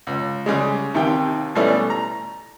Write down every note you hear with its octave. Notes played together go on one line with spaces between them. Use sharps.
C#2
C#3 G3 G#3
D#2 C3 D#3 G5
B2 E3 G3 A3 C#4
A#5